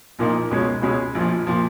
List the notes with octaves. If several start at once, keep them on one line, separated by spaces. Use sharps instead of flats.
A#1 A#2 F3 A#3 D#4
C#2 B2 G#3 C#4
C#2 B2 G#3 C#4
A#1 A#2 F3
A#2 F3